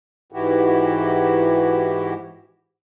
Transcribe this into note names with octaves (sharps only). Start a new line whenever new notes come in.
G#2 E3 E4 F#4 G4